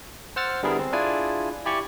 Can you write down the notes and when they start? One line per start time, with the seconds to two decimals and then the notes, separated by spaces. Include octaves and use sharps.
0.36 C5 F#5 E6 F6 A6
0.63 D3 G3 B3 E4 G#4 A#4
0.79 C4
0.93 D4 E4 F4 G#4 D5 G#5
1.66 E4 G4 D5 G#5 C#6